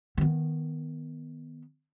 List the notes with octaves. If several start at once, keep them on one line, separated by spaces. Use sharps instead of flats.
D#3 B3